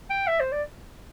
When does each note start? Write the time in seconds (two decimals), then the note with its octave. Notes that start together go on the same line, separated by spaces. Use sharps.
0.10 G5
0.27 E5
0.40 C5
0.52 D5